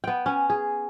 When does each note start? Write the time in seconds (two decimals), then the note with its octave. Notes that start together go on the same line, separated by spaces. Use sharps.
0.04 B3 G5
0.26 C#4
0.50 G#4